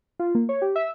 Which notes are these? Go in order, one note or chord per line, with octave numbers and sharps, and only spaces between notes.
F4
A#3
C#5
G4
E5